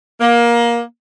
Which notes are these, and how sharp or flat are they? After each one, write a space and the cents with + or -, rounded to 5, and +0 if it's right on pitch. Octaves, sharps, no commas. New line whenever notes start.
A#3 +20